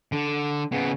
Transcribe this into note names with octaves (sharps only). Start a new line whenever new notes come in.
D3
C#3 B3